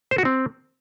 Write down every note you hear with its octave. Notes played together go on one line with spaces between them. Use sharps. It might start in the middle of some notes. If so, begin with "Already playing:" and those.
C5
F#4
C4